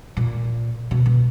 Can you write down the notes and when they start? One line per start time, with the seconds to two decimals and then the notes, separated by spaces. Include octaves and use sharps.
0.17 A#2
0.91 B2
1.06 B2